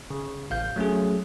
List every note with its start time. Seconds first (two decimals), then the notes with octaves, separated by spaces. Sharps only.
0.10 C#3
0.50 A1 F5 G6
0.76 F#3 A3 C#4 G#4